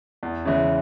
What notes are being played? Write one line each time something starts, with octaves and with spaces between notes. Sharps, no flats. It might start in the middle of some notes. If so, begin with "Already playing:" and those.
E2
C#3 E3 G#3